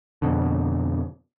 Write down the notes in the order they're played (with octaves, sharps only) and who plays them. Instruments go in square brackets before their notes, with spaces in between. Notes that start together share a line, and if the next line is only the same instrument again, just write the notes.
[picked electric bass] F2 B2 D3